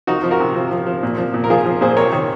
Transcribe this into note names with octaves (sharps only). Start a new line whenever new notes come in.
F3 D#4 F#4
F3
F#4 A#4
C3
F3
F3
F3
A#2
F3
A#2
A#4
F3 F4 G#4
F3
A#2 G#4 C5
C3 A#4 C#5
D#3